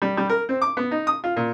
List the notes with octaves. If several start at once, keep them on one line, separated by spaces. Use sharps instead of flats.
G3
G3
A#4
C4
D6
B3
D#4
D#6
F4
A#2